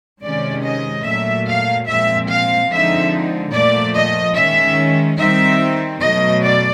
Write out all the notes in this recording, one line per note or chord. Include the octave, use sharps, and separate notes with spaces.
C3 D#3 G#3 C#4 D5
D#5
A#2 F#3 A3 E5
F5
A#2 F3 G#3 C4 E5
F5
D3 F3 G#3 C4 D#4 E5
A#2 F3 A3 D5
D#5
D#3 G#3 C#4 E5
D#3 G3 C4 D#4 E5
B2 F#3 A3 D#5
D5